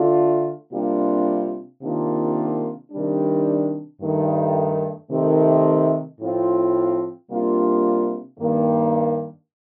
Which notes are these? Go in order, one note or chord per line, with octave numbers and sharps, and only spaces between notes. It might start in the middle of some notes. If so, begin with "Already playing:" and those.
Already playing: D3 A3 D4 F4
C3 G3 A#3 D4 F4
C3 D#3 A#3 D4 F4
C3 D#3 G3 D4
G2 D#3 A3
C3 D#3 A3
A2 F3 C4 F4
C3 G3 A#3 D4 F4
G2 D#3 A#3